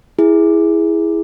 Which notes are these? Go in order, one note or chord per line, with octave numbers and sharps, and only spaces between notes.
E4 G#4